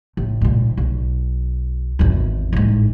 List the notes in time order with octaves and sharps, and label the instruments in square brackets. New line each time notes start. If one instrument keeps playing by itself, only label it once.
[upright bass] A1
A#1 G#2
B1
G#1 E2
A1 G#2